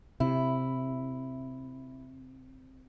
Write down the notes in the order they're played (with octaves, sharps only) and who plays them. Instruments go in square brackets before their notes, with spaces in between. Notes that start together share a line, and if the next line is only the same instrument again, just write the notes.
[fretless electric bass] C3 [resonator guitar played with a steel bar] E4